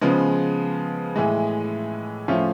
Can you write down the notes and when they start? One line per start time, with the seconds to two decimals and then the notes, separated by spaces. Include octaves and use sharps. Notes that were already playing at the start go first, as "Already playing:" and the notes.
0.01 C#3 F3 G#3 B3
1.16 A2 E3 G#3
2.28 A2 F3 A3 C#4 F4